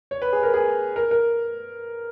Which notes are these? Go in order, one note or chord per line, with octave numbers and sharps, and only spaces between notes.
C#5
B4
G#4
A#4
G#4
A#4
A#4